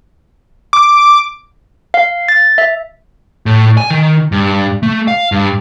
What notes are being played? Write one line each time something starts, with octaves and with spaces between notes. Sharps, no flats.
D6
F5
A6
E5
A2
G#5
D#3
G2
A3
F5
G2